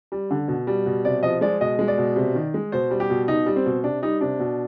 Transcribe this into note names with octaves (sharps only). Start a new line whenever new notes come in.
G3
D3
B2
G3
B2
C3 D5
F3 D#5
G#3 D5
B2 D#5
G#3
D5
B2
C3
D#3
G#3
B2 C5
G3
G4
B2
B2 D#4
G3
C4
B2
C3 D4
G3 D#4
C3 D4
B2